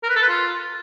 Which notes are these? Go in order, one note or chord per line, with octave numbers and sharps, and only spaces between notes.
A#4
B4
A4
B4
F4